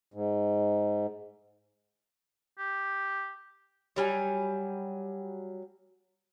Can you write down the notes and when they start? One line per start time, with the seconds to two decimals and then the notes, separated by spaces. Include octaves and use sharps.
0.14 G#2
2.59 G4
3.96 F#3 G3 G#5